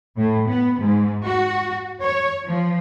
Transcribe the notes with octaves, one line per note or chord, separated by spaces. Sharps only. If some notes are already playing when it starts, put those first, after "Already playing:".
A2
B3
G#2
F#4
C#5
F3